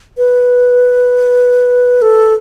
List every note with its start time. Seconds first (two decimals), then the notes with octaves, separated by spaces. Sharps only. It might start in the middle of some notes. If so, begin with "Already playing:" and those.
0.17 B4
2.02 A4